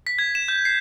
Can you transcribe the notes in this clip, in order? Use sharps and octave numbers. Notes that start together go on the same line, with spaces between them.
B6
G#6
E7
G6
C7